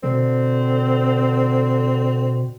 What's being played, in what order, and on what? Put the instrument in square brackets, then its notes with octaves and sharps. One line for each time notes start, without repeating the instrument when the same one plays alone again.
[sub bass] B2 [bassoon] D3 [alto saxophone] C4